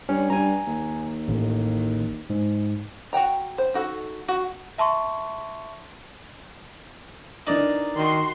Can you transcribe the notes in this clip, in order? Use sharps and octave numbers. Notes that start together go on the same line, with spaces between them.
G2 C#4
G2 G#5 A#5
D#2
A1
G#2
F#4 F#5 G5 A#5
C5
D#4 F#4 A4
F#4
E5 A5 C6 C#6
E3 D4 D#4 A#4 D5 A#5
D#3 F#4 C6